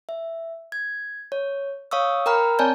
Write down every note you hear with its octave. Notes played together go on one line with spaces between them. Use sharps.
E5
G#6
C#5
C#5 F5 C#6 D#6 E6
A#4 G5 A#5 B5 F6
C4 C#5 D5 G#5 A5 G6